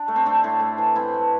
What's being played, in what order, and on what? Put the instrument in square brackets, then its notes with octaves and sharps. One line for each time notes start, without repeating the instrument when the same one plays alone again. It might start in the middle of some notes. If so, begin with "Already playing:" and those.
Already playing: [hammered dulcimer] D4
A3
C4
A3 D4
A2
A3
E3
E3 C4 E4
A3